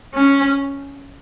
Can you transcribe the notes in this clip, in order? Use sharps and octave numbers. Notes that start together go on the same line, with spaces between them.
C#4